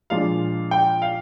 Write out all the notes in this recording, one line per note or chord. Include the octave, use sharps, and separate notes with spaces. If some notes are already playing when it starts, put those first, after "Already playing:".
A#2 F3 G#3 D4 F4 F5
G5
F5